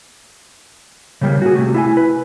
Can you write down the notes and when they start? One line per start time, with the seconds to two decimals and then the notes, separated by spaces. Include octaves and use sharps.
1.21 C#3 G3 A#3
1.42 F#4 G#4
1.55 C3 A3
1.74 E4 F5 G#5
1.97 B4